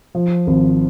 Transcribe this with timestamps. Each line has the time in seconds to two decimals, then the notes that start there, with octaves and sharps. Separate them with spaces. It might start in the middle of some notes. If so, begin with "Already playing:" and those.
0.15 F3
0.47 G#1